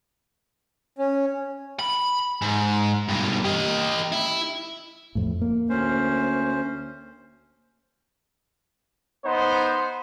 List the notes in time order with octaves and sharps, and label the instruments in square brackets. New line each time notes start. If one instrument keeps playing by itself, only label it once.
[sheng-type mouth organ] C#4
[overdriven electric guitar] B5
G#2
G2 B2
G4 D#5
E4
[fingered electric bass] F2 A2
A#3
[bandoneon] D2 C#4 C5
[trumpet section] B3 D#4 C5